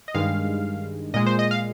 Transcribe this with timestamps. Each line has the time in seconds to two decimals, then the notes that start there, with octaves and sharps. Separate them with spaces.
0.08 D#5
0.14 G2 D#3 G#3 F5
1.14 A#2 G#3 D#5
1.26 C5
1.39 D#5
1.51 F5